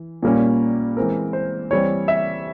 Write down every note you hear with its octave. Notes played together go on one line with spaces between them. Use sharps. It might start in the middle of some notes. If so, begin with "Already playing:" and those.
Already playing: E3
A#2 G3 A#3 C#4
E3 G#3 C4 A#4
C5
E3 G3 C4 C#5
E5